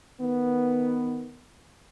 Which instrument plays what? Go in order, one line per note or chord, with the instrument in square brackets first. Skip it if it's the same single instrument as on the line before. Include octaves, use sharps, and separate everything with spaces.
[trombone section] D#3 B3